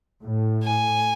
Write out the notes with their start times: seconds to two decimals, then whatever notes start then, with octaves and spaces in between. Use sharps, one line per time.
0.24 A2
0.63 G#5